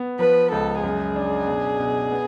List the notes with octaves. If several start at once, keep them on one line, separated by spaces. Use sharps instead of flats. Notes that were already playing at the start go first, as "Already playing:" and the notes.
Already playing: B3
F3 B4
C#2 A4
F#2 G#4
D4
B2
B2
B3